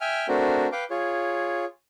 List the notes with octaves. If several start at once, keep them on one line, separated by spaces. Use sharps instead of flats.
E5 G5 G#5 F6
A3 C4 D4 F#4 A#4
B4 F5 G5 D6
F4 G#4 C#5